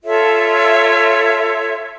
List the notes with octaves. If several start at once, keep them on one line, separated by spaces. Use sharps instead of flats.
F4 A4 C#5 E5